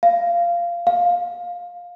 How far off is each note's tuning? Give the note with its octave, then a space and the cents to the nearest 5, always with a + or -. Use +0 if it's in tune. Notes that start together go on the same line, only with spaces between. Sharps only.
F5 -15
F5 +15